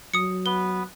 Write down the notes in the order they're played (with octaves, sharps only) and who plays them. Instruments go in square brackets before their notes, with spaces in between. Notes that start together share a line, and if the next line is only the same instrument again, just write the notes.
[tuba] F#3 [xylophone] D#6 C#7
[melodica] B3 B4 [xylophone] G7